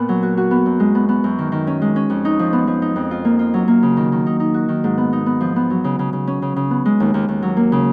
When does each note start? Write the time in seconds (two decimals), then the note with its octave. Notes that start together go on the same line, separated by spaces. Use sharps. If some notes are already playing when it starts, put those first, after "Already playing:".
Already playing: A#2 B3
0.09 F#3
0.23 F#4
0.37 F#4
0.51 B3
0.66 F#2
0.80 G#3
0.95 B3
1.09 B3
1.24 F#2
1.38 D#3
1.52 D#3
1.67 C#4
1.82 G#3
1.96 C#4
2.10 F2
2.25 D#4
2.39 F3
2.53 B3
2.67 F3
2.82 D#4
2.96 F2
3.11 F4
3.25 A#3
3.39 F4
3.54 F#3
3.68 A#3
3.83 C#3
3.97 D#3
4.12 D#3
4.26 D#4
4.40 D#4
4.54 F#4
4.69 D#3
4.84 G#2
4.98 B3
5.13 D#4
5.26 B3
5.41 F3
5.56 B3
5.70 F#3
5.84 C#3
5.99 C#3
6.13 C#3
6.27 C#4
6.42 C#3
6.56 C#3
6.71 B3
6.86 G#3
7.00 D#2
7.14 D#2
7.28 D#2
7.42 F#3
7.57 A#3
7.72 C#3